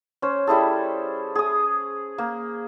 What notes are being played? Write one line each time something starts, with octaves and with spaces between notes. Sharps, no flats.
C#4 C5
G3 E4 G#4 A4
G#4 D#6
A#3